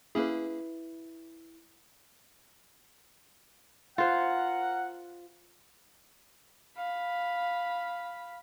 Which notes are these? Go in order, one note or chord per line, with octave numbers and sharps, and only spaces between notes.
A#3 C#4 E4 G#4 B4
F4 A#4 C5 F#5
F5 B5